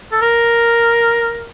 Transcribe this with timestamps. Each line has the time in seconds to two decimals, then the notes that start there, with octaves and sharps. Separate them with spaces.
0.12 A4
0.21 A#4